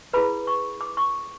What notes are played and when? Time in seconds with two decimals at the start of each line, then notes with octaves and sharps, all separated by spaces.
0.13 E4 G#4 B4 B5
0.47 C#6
0.81 D6
0.97 C#6